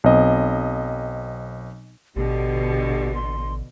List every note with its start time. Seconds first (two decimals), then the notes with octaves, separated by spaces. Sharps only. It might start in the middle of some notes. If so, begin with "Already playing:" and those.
0.04 B1 C4 D#5
2.16 A1 B2 D3 G4
3.15 C6